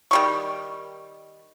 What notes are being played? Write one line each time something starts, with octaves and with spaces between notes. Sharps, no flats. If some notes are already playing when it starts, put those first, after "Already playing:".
D#3 G3 C#6